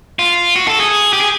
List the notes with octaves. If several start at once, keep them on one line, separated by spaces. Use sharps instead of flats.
F4
F#4
A4
G#4
G4
G#4